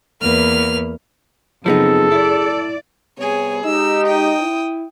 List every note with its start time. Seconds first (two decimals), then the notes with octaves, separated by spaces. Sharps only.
0.21 E2 A#3 B4 F6
1.66 F#2 C#3 F3 B3 C4 D#4 G#4 A4
2.12 E4 D5
3.18 C3 G3 B3 G#4 C#5
3.65 G#3 D#4 G4 E6
4.07 G5 D#6
4.41 E4